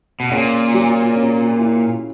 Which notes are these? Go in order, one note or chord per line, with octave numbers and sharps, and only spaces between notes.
B2
A#2 C#3
F#3
C#4
E4